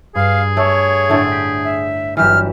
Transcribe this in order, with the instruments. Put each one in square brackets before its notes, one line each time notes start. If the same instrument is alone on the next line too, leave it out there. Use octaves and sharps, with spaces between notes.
[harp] G2 [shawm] G#4 [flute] F5
[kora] A3 [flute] C#5
[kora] A2 D3 A3
[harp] G6 B6 D7
[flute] E5
[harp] G1 F#3 E6 [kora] E3 G4 [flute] F6